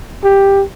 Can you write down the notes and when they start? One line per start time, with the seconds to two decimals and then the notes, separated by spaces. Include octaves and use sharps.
0.24 G4